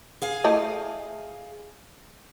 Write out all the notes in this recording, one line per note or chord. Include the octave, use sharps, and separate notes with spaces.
G#4 F5 G#5
A3 E4 D#5